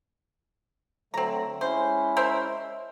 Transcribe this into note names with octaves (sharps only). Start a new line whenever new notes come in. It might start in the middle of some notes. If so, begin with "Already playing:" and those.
D3 F#3 A3 C4 A#5
G#3 C#4 E4 C5
A#4 C5 E5